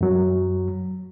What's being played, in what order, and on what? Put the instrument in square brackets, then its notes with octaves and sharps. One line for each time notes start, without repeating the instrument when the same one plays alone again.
[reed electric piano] F#2 F#3